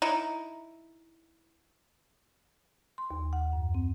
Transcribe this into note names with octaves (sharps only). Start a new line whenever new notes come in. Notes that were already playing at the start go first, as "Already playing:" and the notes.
D#4 E4
C6
D#2
F#5
F#2
C4